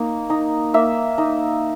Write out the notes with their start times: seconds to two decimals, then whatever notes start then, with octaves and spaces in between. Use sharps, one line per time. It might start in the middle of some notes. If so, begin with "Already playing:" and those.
Already playing: A#3 D#4
0.30 D#4
0.74 A#3 E5
1.18 D#4